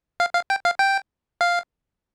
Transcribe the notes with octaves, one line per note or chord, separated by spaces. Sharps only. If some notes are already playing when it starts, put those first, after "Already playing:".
F5
F5
G5
F5
G5
F5